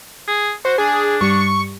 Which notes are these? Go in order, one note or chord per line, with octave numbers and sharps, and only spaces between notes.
G#4
F#4 C5
D4 G#4
G2 G3 C#6